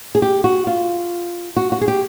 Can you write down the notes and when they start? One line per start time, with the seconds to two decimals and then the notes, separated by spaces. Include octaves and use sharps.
0.15 G#4
0.22 G4
0.44 F#4
0.67 F4
1.56 F#4
1.72 F#4
1.81 G#4
1.88 G4